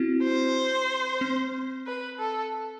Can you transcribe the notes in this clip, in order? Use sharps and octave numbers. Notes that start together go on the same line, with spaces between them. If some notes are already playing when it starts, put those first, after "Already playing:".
Already playing: C4 E4 F#4
C5
C4
B4
A4